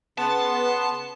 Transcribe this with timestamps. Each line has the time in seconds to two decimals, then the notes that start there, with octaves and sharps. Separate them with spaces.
0.18 C#3 B3 A5 C6